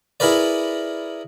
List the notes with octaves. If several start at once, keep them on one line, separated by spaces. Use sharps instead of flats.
E4 G#4 A#4 B4 D5